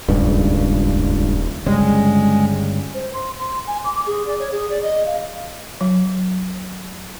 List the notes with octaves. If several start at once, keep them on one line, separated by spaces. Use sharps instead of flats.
D#1 C#2 G2 C#3
G1 C#3 G3 G#3
C5
C6
C6
G#5
D6
G#4
D5
C#5
G#4
D5
D#5
F5
F#3